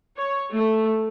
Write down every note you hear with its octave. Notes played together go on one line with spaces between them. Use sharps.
C#5
A3